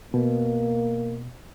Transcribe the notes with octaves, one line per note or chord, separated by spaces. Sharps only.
B2 A#3